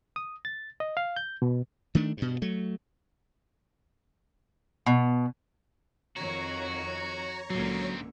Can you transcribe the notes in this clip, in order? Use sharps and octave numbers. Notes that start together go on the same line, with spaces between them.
D#6
A6
D#5
F5
G6
B2
D#3 A3 D4
G2 B2
F#3 A3
B2
F2 D#3 F#4 C#5 A#5 C#6
C#2 A#2 D3 D#3 F#3 C4